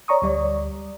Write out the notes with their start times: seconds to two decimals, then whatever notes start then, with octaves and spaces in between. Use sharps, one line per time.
0.08 C#5 D5 A#5 C#6 D#6
0.22 D2 G3 D5